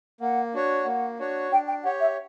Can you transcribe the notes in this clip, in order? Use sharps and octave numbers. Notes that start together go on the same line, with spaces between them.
A#3 F#5
D4 F#4 C#5
A#3 F#5
D4 F#4 C#5
D4 G5
G5
G4 C#5 F#5
E5